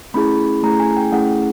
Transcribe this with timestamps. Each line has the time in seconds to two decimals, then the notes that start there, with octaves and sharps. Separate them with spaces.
0.14 A3 C#4 E4 G#4 B5
0.63 A3 C#4 E4 G#4 A#5
0.80 G#5
0.97 G5
1.12 A3 C#4 E4 G#4 F#5